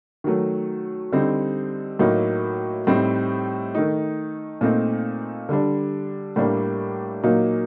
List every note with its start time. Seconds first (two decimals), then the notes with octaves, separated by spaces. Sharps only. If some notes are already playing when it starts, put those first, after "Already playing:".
0.24 D#3 F#3 A3
1.12 D3 G3 C4 D#4
1.99 A2 F#3 A#3 D#4
2.87 A2 G3 C4 D#4
3.75 D#3 A3 D#4
4.61 A#2 A3 C4 D#4
5.49 D3 G3 D4
6.36 A2 G3 A#3 D4
7.23 A#2 F#3 A#3 D#4